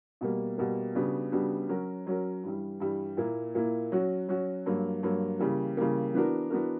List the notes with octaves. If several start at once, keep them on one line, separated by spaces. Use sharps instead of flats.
B2 G3 A#3
B2 G3 A#3
C#3 G3 B3 D4 F#4
C#3 G3 B3 D4 F#4
F#3 C#4 F#4 A#4
F#3 C#4 F#4 A#4
G2 E3 G3
G2 E3 G3
A#2 A#3 E4
A#2 A#3 E4
F#3 C#4 F#4
F#3 C#4 F#4
G2 F#3 A#3
G2 F#3 A#3
C#3 E3 G3 A#3
C#3 E3 G3 A#3
E3 B3 D4 F#4 A#4
E3 B3 D4 F#4 A#4